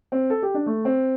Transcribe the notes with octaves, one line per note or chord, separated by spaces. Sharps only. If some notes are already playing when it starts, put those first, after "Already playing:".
C4
A4
G4
D4
A3
C4